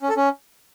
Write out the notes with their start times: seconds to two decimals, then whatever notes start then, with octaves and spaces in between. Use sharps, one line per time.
0.01 C#4
0.09 A4
0.16 C#4